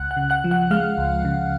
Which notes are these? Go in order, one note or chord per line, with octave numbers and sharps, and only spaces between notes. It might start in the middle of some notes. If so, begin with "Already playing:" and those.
Already playing: C#2 F#5 F#6
F#5 F#6
C#3
F#5 F#6
F3
F#5 F#6
G#3 F5 F6
C#2
C#3